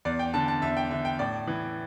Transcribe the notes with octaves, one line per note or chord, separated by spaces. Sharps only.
E2 D5
G5
D3 A5
A5
E2 E5
G5
D3 E5
G5
A2 D5
E3